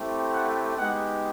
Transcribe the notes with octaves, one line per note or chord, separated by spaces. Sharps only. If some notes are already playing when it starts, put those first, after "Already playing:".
Already playing: A3 C4 E4 G4
F#5
G#3 B3 D#4 G4 F#5